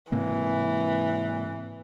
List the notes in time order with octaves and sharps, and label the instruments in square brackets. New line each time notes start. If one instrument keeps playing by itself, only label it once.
[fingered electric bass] G#2 C3 A#3 [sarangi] E3